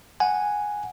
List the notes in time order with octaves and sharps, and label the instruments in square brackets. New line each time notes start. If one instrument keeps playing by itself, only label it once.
[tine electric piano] F#5 G#5